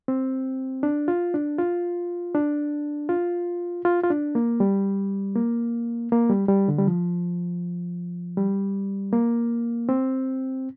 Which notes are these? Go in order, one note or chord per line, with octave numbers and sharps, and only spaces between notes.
C4
D4
F4
D4
F4
D4
F4
F4
F4
D4
A#3
G3
A#3
A#3
G3
G3
D3
G3
F3
G3
A#3
C4